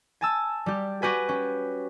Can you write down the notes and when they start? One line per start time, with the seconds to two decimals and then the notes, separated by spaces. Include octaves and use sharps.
0.21 G#5 A5 E6
0.66 G3 G4
1.02 F#4 G4 B4 G#5
1.29 C#4